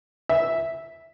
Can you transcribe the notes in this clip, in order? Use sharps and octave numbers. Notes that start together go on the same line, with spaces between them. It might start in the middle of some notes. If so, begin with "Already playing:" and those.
E5